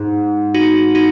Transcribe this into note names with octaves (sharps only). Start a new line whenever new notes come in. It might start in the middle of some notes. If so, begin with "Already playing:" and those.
Already playing: G#2
D#4 F#4
D#4 F#4